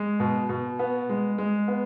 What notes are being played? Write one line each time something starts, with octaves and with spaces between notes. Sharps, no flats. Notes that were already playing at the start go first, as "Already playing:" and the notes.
Already playing: G#3
B2
B2
B3
G#3
G#3
B3